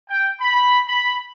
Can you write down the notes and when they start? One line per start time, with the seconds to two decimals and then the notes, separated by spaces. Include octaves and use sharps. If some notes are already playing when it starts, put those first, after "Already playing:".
0.10 G5
0.40 B5
0.87 B5